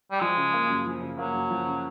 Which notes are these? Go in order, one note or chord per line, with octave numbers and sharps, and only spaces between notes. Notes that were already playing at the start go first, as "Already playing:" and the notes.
G3
F3 G#3
C#3
A#3
F#2
F3
C#3
F#3 A#3
F#2
F3
C#3